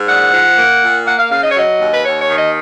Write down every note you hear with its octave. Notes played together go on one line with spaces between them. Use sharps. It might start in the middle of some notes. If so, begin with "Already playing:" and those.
Already playing: G#2
A#2 F#5
F3
A#3
A#2
A#3 F#5
F5
C#3 F5
D#5
C#5
F#3 D#5
D#2
B4
D#2 C#5
C#5
D#3
D#5